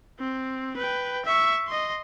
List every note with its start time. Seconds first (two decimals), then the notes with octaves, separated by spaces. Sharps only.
0.19 C4
0.77 B4 G5
1.25 E5 C#6
1.68 D#5 C6